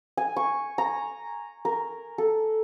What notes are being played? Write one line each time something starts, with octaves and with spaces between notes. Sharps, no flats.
G#5
C#6
A#5
A#4
A4